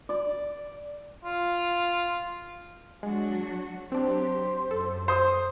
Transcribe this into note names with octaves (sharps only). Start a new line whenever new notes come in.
D5
F4
F#3 G#3 D4 F#4
F#3 C4 D4 G4 C5
F#2 A4
C5 D#6